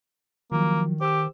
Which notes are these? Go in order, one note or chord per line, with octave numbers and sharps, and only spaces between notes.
D#3 F3 F#3 A#3
G4 C5 E6